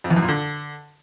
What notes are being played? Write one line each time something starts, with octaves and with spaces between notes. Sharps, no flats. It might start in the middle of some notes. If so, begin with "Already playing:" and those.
F2
E2
F#2
A#2
D3